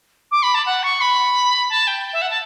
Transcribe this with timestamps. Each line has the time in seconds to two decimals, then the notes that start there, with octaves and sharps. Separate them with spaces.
0.31 D6
0.42 B5
0.54 A5
0.66 F#5
0.83 C#6
1.00 B5
1.69 A5
1.87 G5
2.13 E5
2.21 F#5
2.30 A5